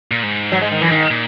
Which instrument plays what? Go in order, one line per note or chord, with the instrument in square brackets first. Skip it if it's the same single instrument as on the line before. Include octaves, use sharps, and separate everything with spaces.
[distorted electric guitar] A#2
G#2
[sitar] F#3
G#3
D#3
[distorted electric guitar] F#2 [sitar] E3
[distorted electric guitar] G#2 [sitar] D#3
[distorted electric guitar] A#2